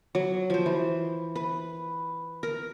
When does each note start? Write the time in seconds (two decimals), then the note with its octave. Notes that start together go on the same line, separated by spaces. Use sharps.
0.15 F#3
0.50 F3 C5
0.66 E3
1.36 B4
2.43 A#4